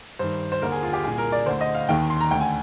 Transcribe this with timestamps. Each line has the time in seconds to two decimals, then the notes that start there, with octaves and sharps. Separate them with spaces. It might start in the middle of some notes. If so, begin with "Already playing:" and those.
0.19 G2 D#3 C5
0.52 C5
0.62 D#2 D3 A#4
0.72 G#4
0.83 F4
0.93 G4
1.04 C2 A#2 G#4
1.18 A#4
1.32 D5
1.46 D2 D3 C5
1.61 D#5
1.75 F5
1.89 D#2 D#3 G5
2.10 C6
2.21 A#5
2.31 D2 D3 G5
2.40 G#5